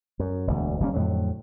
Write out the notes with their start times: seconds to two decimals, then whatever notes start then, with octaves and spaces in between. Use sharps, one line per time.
0.19 F#2
0.47 E1 D2
0.80 F#1 G3 A#3 C#4
0.94 F2 A2 D3 F#3